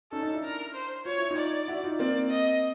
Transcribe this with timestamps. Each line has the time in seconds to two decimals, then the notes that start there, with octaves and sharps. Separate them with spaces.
0.12 C#4 D#4 A4
0.23 C#4 D#4
0.32 D4 E4
0.44 A#4
0.74 C5
1.05 F4 C#5
1.18 E4
1.31 D#4 F4
1.38 D5
1.68 E4 F#4
1.84 D#4 F4
1.99 A#3 C4 D5
2.30 D#5